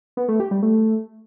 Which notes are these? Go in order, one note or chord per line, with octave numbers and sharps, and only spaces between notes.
B3
A3
G4
G3
A3